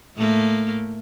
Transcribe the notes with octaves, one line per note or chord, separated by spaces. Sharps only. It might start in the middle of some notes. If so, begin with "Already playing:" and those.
A2 A3 A#3